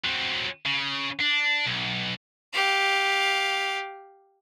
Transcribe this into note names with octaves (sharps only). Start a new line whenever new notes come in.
F#3 C4
C#3
D4
B1
G4 F5